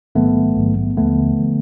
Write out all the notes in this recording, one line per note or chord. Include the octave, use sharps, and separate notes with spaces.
A#1 G#2 D#3 F#3 A3 B3
A#1 G#2 D#3 F#3
D#2 D3 F3 A3 B3
D3 F3